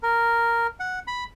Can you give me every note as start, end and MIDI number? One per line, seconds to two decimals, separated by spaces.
0.03 0.67 70
0.80 0.99 78
1.07 1.24 83